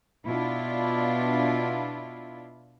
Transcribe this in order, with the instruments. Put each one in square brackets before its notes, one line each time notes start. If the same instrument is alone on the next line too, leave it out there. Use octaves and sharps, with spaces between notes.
[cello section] B2 D4 E4 F4